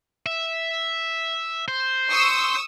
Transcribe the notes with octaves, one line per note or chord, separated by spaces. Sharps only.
E5
C5
C#6 D#6 E6